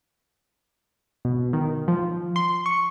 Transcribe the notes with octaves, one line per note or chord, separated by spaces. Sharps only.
B2
D#3
F3
C6
C#6